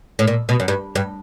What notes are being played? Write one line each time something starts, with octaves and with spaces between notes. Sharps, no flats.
A2
A#2
B2
F#2
G2
G2